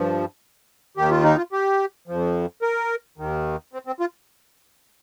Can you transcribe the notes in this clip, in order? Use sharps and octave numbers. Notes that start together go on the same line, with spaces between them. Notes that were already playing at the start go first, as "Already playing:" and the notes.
Already playing: G2 F3
D#2 D#3 G4
F4
D#4
F4
G4
F2 F3
A#4
D#2 D#3
C4
C4
F4